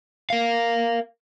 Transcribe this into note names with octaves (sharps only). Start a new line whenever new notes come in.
A#4 F5